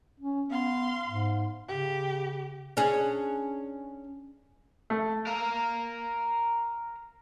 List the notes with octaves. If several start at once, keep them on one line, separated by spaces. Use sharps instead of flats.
C#4
B3 F5 C6
G#2
C#3 G4
C#4 D4 G#4
A3
A#4 F5